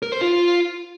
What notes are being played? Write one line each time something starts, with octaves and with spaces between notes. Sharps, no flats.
A#4
C5
F4